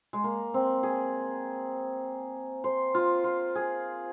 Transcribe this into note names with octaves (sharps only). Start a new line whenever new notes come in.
G#3
A#3
C4
G#4
C5
F4
F4
G#4